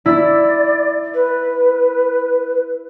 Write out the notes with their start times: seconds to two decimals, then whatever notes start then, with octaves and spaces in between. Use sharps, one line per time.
0.06 E4 D5
1.14 B4